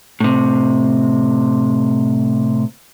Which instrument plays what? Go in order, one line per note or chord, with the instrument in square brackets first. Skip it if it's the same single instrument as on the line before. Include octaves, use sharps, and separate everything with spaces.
[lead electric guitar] A2 C3